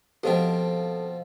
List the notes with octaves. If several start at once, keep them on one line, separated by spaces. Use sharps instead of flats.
B2 F3 C4 G4 A4 C5 D#5